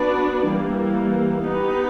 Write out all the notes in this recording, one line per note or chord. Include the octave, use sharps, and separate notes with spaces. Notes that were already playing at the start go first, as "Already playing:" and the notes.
Already playing: B3 D4 F#4 B4 D5
E3 G3 A#3
B3 D#4 G4 B4